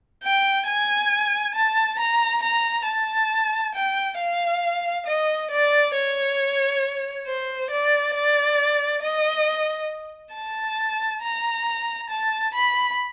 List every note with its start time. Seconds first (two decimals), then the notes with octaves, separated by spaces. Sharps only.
0.23 G5
0.67 G#5
1.55 A5
1.99 A#5
2.43 A#5
2.87 A5
3.75 G5
4.19 F5
5.06 D#5
5.51 D5
5.95 C#5
7.27 C5
7.71 D5
8.14 D5
9.02 D#5
10.33 A5
11.22 A#5
12.10 A5
12.54 B5